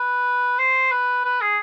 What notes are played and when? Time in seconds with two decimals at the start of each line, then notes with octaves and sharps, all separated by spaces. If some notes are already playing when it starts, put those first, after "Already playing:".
Already playing: B4
0.59 C5
0.91 B4
1.25 B4
1.41 G#4